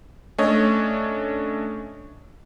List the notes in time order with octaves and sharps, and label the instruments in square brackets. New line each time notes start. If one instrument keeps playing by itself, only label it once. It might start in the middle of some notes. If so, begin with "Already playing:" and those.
[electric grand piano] A3 C#4 D4 C#5 D#5